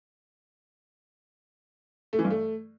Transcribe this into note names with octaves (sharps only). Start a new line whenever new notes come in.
A3
E3
G2
A3